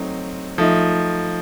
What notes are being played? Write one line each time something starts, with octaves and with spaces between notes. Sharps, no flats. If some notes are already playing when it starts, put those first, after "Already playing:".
Already playing: F#3 A3 C4 D#4
F3 A3 D#4